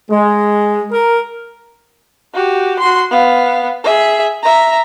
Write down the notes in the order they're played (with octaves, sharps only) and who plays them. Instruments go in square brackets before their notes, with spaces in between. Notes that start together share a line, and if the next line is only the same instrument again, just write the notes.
[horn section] G#3
A#4
[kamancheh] F#4 G4
F#4 C6
B3 F5
G#4 E5
E5 A#5